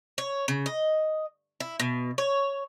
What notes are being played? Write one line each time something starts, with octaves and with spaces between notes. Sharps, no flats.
C#5
C#3
D#5
E4
B2
C#5